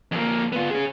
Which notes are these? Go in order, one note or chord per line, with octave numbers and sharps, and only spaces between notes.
F2 A#3
B3 F4
C#4 G#4